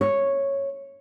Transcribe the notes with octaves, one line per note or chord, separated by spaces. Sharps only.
C#5